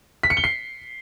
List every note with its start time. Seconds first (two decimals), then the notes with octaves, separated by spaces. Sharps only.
0.23 B6
0.30 C#7
0.37 G7
0.44 C7